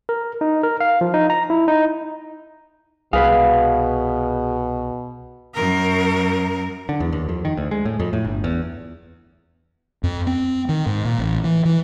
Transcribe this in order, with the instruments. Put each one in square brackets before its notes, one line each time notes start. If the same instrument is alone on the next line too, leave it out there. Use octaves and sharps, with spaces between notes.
[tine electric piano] A#4
D#4
A#4
F5
F3
D#4
A#5
E4
D#4
[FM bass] C2 [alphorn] B2 [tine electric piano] G#4 [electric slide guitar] B4 F5
[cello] F#2 A#4
[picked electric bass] D3
E2
D#2
F2
D#3
D2
G#3
A2
F2
A2
G1
E2
[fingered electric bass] F2
C4
D#3
G#2
A#2
A1
E3
E3